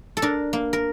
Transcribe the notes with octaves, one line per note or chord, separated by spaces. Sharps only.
A4
D4 A#4
A#3
A#4